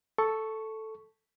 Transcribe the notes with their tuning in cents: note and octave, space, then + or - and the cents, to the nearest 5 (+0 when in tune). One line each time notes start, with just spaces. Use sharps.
A4 +0 C#6 +0